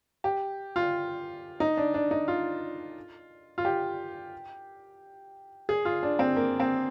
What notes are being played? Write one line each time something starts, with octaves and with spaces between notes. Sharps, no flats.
G4
F4
D#4
D4
D4
D#4
F4
F4
G4
G#4
F4
D4
C4
A#3
C4